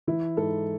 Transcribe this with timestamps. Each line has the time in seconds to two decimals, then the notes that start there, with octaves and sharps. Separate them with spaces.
0.07 E3 E4
0.37 G#2 A4